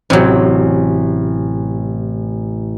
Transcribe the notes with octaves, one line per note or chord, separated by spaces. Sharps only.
A1 C3 F#3